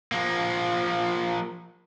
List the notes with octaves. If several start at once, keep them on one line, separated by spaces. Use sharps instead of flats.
F3 A#3